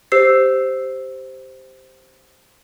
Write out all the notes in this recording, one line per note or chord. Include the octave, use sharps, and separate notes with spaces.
G4 C5 E6 C7